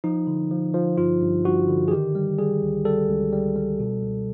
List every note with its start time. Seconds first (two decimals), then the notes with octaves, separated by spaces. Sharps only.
0.04 F3 D#4
0.27 D3
0.51 F3
0.74 F3
0.98 G2 F4
1.21 G2
1.45 G2 F#4
1.68 D3
1.88 G#4
1.91 D#3 G4
2.15 G3
2.39 G3 G#4
2.63 C#2
2.85 G3 A4
3.09 C#2
3.33 G3
3.56 G3
3.80 B2
4.03 C#2